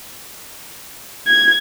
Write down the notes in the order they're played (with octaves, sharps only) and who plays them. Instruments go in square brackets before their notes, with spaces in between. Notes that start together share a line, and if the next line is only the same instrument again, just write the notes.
[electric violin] G#6